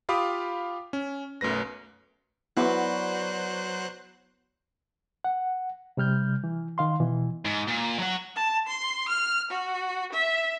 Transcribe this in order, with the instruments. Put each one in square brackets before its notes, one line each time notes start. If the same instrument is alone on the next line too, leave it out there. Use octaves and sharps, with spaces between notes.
[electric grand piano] F4 G4 F5 B5 D6 D#6
C#4
B1 F#2 A3 B4 A#6
[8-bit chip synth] F#3 C5 F#6 [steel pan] B3 E4 [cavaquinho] F#4 B4 D5
[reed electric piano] F#5
C3 G3 F6 G6
E3
D#3 F5 C6
B2 E3
[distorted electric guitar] G#2
A#2
F#3 F#5
[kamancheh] A5
C6
F6
F#4
E5